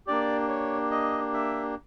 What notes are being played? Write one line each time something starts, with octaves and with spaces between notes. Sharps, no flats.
A#3 D4 G4 D5
C#5
D#5
E5